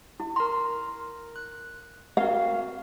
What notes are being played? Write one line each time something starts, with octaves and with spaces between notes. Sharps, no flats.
E4
A#4 A#5 C6
F#6
C4 F#4 A#4 F5